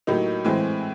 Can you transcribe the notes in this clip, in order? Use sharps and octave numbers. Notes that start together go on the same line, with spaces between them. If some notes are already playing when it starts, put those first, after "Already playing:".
A2 F#3 A#3 D#4 G4
A2 E3 G#3 C4